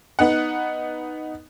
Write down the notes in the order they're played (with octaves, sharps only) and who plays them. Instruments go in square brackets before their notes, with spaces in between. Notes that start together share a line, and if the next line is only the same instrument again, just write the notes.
[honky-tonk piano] B3 D#4 F#5